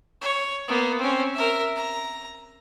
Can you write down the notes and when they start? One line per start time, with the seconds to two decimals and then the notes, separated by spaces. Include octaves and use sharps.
0.21 C#5
0.68 A#3 B3
0.99 C4 C#4
1.34 A#4 E5
1.76 A#5